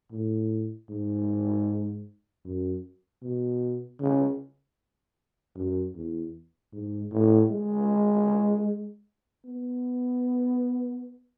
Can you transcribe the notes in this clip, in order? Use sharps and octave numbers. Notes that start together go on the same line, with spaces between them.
A2
G#2
F#2
B2
C#3
F#2
E2
G#2
A2
G#3
B3